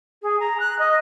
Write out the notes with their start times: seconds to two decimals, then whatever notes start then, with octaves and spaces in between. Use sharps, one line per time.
0.22 G#4
0.40 A#5
0.60 F#6
0.79 D#5